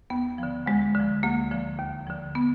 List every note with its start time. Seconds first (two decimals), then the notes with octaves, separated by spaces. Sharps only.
0.10 D#2 B3
0.38 D3 F3
0.66 D2 G#3
0.95 D3 F3
1.23 D2 A#3
1.51 D3 F3
1.79 D#2
2.07 D3 F3
2.35 B3